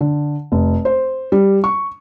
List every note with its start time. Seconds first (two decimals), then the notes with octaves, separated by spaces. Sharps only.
0.01 D3
0.52 F1
0.85 C5
1.32 G3
1.64 C#6